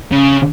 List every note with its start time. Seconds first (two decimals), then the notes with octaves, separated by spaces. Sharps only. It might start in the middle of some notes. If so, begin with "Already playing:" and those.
0.12 C#3